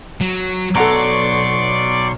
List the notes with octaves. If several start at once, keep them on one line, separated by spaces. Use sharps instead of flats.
F#3
B1 F#3 A4 D5 F#5 A#5 C6 C#6